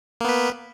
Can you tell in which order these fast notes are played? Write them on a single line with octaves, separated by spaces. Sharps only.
A#3 B3 B4